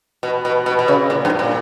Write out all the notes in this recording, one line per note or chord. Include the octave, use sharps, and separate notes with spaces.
B2
B2
B2
B2
C#3
A#2
G2
A#2